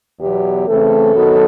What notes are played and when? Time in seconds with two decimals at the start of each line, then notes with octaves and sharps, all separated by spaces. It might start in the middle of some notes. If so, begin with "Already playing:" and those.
0.19 E2 B2 F#3 G4
0.67 C#3 E3 A3 C4 A4
1.14 F#2 D#3 F#3 B3